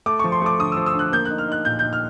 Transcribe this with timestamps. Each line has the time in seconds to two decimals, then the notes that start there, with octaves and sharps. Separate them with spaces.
0.06 A3 D6
0.19 C#6
0.24 F3
0.32 C6
0.41 A3 D6
0.59 D3 D#6
0.72 E6
0.77 F3
0.86 E6
0.94 D3
0.99 F#6
1.12 A#3 G6
1.25 F#6
1.31 D#4
1.38 F6
1.48 D#4 F#6
1.65 A#2 G6
1.79 D#4 G6
1.93 F6